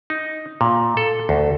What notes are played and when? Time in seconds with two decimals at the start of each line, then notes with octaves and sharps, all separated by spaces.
0.10 D#4
0.61 A#2
0.97 A4
1.29 D2